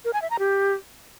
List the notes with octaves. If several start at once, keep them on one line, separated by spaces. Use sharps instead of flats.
A#4
G#5
E5
A#5
G4